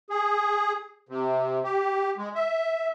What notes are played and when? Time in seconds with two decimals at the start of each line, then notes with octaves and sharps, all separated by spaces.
0.10 G#4
1.09 C3
1.64 G4
2.17 G#3
2.35 E5